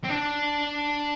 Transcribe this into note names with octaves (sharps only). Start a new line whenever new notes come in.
C4
D4